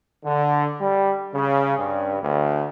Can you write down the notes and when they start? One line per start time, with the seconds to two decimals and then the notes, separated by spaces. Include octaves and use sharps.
0.25 D3
0.80 G3
1.34 C#3
1.78 G2
2.22 D2